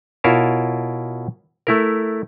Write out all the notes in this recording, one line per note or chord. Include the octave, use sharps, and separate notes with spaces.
B2 E4 F4 A#4 C#5 A5
A3 E4 A#4